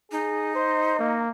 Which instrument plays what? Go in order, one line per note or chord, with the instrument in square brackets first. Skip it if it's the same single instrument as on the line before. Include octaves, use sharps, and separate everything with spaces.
[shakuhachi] D#4 [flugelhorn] G#4
[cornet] C5 [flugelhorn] D#5
[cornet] A#3